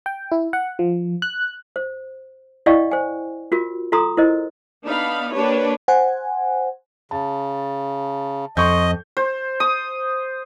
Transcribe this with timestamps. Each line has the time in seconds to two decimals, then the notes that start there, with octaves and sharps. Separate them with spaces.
0.06 G5
0.32 E4
0.53 F#5
0.79 F3
1.22 F#6
1.76 C5
2.66 E4 D5 D#5 F5 G5 C#6
2.91 C5 G#5
3.52 F4 F#4 A#4
3.92 F4 A4 A#5 C6 D#6
4.17 E4 A#4 C5 D#5
4.85 B3 D4 D#4 F5 B5
5.33 A#3 D4 G4 B4 C#5
5.88 C5 F#5 G#5
7.11 C#3 A5
8.57 F2 D#5 C6 C#6 G6
9.17 C5
9.60 D#6